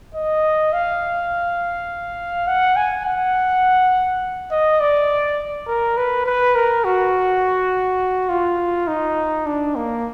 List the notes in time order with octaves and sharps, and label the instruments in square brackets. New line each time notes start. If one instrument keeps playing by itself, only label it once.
[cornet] D#5
F5
F#5
G#5
F#5
D#5
D5
A#4
B4
B4
A#4
F#4
F4
D#4
D4
A#3